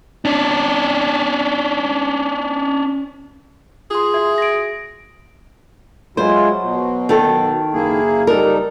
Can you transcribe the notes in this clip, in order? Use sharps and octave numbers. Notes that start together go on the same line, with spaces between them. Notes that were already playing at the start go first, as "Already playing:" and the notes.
C#4 D4
F4 G#4 C6
F#4 E5 G#6
A#6 D7
F#3 G#3 E4 F4 C5
B2
D#3 A4
F#1 A#3 E4 G#4
G3 D#4 A4 A#4